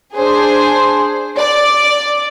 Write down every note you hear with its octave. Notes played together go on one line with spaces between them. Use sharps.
D4 G#4 C5
D5